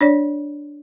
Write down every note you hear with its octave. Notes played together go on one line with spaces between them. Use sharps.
D4 C#5 D5